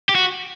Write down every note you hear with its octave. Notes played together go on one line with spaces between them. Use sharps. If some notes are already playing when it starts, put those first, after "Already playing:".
G4
F#4